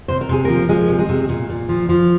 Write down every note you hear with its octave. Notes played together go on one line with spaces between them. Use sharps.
C3 C5
A#4
C3 G#4
F3 A#3 A#4
F3 G#3 G#4
C3
G#3 G#4
C3
A#2
A#2
F3
F3